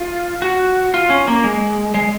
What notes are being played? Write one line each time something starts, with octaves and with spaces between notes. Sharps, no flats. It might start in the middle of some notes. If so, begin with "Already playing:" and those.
Already playing: F4
F#4
F4
C#4
A#3
G#3
G#3